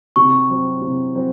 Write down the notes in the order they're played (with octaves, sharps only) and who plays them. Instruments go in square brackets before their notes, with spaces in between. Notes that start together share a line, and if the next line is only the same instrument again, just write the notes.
[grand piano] C3 [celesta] C#6
[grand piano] F#3 C4 F#4
C3
F#3 C4 F#4